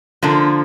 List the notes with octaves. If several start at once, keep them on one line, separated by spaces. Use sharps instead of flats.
D3 F3 A#3